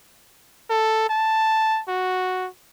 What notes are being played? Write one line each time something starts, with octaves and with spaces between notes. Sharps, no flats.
A4
A5
F#4